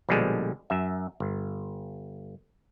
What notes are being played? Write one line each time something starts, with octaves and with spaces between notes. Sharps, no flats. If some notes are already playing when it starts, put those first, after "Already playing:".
A#1 B2 D3 F3 G3 G#3
F#2 E5
G1